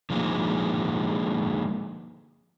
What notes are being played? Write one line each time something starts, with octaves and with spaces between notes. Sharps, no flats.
D3 F3 G#3 A#3 D#4